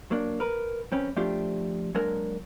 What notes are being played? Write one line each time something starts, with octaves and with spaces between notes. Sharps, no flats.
F#3 A#3 D4
A#4 B4
F#2 C4 C#4 B4
F3 A3 C4 D4 F4 G4
F#3 G#3 A#3 D4 A#4